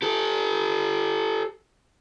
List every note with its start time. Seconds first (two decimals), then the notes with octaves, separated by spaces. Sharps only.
0.02 G4 A4